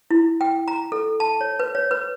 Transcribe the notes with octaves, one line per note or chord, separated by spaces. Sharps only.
E4
G5
A#5
A4
A5
C#5
B4
C#5
B4